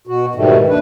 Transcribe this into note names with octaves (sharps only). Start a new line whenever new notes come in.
B2 F#4
G#2 B2 D#3 G3 A3
D#2 D4 B4